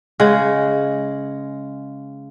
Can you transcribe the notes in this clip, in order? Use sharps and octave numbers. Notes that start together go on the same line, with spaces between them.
C#3 G#3 F#5